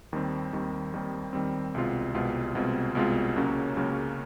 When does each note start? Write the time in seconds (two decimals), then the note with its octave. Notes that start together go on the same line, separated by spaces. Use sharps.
0.13 D#2 D#3 G3 C4
0.53 D#2 D#3 G3 C4
0.93 D#2 D#3 G3 C4
1.33 D#2 D#3 G3 C4
1.74 C2 B2 G#3 C4 F4
2.14 C2 B2 G#3 C4 F4
2.55 C2 B2 G#3 C4 F4
2.95 C2 B2 G#3 C4 F4
3.36 C#2 C#3 F#3 A#3 C#4
3.77 C#2 C#3 F#3 A#3 C#4